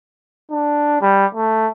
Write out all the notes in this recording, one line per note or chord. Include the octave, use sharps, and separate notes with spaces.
D4
G3
A3